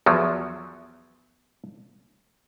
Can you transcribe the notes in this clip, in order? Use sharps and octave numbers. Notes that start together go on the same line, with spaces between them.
E2 F3 F#3